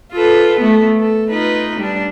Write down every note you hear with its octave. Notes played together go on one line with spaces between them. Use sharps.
F4 A4 B4
A3 B3
A4
D#4 F4 B4
G3 D4